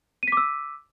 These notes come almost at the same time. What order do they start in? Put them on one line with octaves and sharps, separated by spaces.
D#7 B6 D6 E6